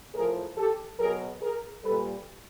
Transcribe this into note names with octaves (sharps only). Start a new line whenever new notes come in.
A2 F3 G#4 A#4
G4 A4
B2 F#3 G#4 A#4
G#4 A#4
A#2 G3 A4 B4